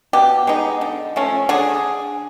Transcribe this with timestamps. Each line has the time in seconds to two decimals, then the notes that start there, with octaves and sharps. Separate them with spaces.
0.13 B2 G4
0.47 G#3 B3 D#4
0.81 D3
1.16 F3 A3 C#4
1.49 D3 G#4